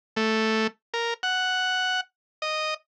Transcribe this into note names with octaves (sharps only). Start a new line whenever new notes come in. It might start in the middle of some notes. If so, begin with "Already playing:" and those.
A3
A#4
F#5
D#5